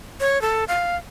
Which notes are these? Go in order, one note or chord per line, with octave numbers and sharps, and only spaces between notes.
C#5
A4
F5